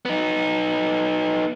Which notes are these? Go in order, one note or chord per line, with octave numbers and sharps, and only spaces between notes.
B3 D#4